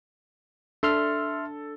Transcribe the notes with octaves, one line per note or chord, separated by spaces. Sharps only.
D4 A4 E5 C6 F6